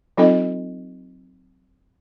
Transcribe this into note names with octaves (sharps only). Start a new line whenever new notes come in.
F#3 C4 D#4 F4 A4 D#5